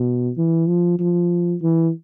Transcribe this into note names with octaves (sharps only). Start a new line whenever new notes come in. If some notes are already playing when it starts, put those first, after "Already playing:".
Already playing: B2
E3
F3
F3
E3